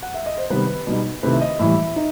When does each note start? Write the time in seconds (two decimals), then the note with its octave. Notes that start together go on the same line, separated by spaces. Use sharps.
0.03 F#5
0.14 E5
0.26 D#5
0.38 C5
0.50 C3 D#3 G3 B3 B4
0.87 B2 G3 D#4
1.23 C3 D#3 A3 C4 E4 B4
1.32 E5
1.41 D#5
1.59 A2 E3 G3 E5
1.96 D#4